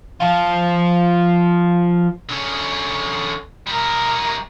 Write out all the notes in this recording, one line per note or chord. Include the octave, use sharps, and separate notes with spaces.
F3 F4
D3 C#4
G3 A#4